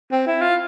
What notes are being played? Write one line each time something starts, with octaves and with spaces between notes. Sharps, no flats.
C4
E4
F4